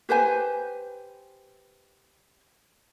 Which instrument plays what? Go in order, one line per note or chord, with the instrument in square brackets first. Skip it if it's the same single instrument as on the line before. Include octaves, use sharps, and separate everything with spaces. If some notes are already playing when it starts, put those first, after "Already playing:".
[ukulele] G4 B4 C5 G#5